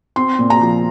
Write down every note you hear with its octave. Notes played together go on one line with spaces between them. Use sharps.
C4 C6
A#2
A#5
F3